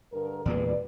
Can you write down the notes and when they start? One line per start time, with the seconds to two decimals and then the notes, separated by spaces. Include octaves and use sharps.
0.13 G2 D3 A#4
0.45 E2 A#2 G#3 B4 D5